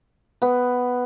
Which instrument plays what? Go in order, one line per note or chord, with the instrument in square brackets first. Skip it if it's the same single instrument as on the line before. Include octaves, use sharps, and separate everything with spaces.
[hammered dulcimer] B3